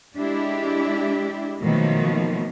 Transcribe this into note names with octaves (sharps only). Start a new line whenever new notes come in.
G#3 D4 E4 G4
B2 D#3 F3 F#3 A3 A#3